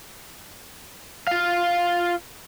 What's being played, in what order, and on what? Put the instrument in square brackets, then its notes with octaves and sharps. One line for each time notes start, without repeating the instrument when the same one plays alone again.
[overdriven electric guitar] F4 F5